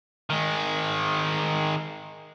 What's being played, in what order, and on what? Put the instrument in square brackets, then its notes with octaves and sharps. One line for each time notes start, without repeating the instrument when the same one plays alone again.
[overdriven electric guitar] D#3 G#3